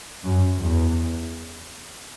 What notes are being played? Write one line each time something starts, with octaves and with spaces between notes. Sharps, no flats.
F#2
E2